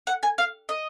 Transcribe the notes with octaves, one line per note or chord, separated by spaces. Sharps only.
F#5
G#5
F5
D#5